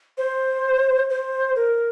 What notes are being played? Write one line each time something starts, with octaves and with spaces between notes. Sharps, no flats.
C5
C5
A#4